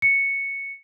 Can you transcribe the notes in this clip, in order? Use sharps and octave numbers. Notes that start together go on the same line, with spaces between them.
C#7